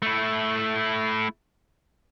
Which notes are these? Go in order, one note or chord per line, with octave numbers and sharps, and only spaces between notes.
A3 E4